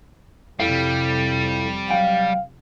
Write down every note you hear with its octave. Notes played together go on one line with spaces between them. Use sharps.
F2 C3 G3 E4 A4 F5
F#3 F5 G5